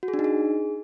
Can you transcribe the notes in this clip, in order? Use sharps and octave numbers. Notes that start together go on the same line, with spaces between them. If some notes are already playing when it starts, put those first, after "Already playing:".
F#4
G#4
D4
D#4
G#4